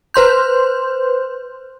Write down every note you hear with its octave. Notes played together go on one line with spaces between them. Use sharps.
B4 C5 C6 G6